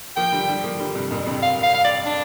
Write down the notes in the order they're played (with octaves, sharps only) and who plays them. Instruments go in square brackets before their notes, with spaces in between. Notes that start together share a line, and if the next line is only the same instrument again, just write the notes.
[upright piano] F3 A#3 [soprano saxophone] G5
[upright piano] D3 G3
D3 G3
F3 A#3
D3 G3
G2 C3
F2 A#2
G2 C3
[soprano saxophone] F5
F5
F5
D5
D4